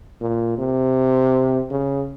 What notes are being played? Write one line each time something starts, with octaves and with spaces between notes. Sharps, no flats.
A#2
C3
C#3